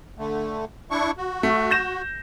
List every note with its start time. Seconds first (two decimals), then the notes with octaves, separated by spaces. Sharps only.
0.18 D3 A3
0.91 D4 E4 C#6
1.18 F#4
1.43 A3
1.71 G6 A#6 E7